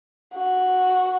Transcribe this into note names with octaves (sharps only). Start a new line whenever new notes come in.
F#4